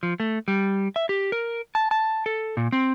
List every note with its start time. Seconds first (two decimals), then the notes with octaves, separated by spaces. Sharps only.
0.03 F3
0.20 A3
0.48 G3
0.96 E5
1.09 G4
1.32 A#4
1.75 A5
1.91 A5
2.26 A4
2.57 A#2
2.72 C4